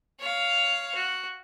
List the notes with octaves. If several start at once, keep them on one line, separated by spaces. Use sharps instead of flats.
C#5 F5
F#4